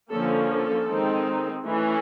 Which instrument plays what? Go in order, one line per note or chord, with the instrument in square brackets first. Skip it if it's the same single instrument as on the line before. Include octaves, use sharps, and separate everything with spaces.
[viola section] D3 F3 A#3 C#4 A4
A4
D#3 G#3 C4 D#4
E3 A3 C#4